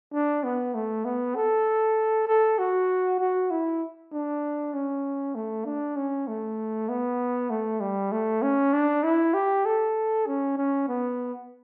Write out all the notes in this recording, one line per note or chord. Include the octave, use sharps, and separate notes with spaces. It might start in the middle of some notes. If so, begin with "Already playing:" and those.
D4
B3
A3
B3
A4
A4
F#4
F#4
E4
D4
C#4
A3
D4
C#4
A3
B3
A3
G3
A3
C#4
D4
E4
G4
A4
C#4
C#4
B3